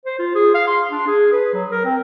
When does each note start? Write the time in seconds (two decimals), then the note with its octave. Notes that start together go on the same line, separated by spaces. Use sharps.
0.06 C5
0.19 F4
0.35 G#4
0.55 F5
0.67 C6
0.90 D4
1.07 G#4
1.32 B4
1.54 F#3
1.71 A#4
1.85 C4